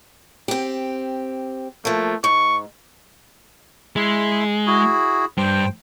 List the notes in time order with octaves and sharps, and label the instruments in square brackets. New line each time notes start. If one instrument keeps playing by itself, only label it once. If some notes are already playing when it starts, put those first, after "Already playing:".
[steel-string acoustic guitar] C4 G4
[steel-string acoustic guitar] F3 A#3 [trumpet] A3
[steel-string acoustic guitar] G#2 [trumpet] C#6
[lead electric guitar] G#3 [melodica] E4 E5 C6
[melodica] E4 F#4 G#4
[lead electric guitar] G2 [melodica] C5 G5